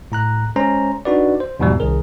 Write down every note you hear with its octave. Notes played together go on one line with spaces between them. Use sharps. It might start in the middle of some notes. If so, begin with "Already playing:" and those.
A2 A#5 F#6
G#3 C#4 C5 A#5
D4 D#4 F#4 B4 D5
C5
E2 G#2 B2 F3 G3
C2 D#3 G#4 A#4